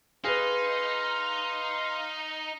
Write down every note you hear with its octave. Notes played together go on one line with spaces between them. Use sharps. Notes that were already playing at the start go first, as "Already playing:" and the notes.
D#4 G#4 B4 F5 C6